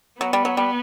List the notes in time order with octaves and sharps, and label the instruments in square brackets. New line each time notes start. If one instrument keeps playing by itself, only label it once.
[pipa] F#3 [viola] B3
[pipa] G3
F#3
G3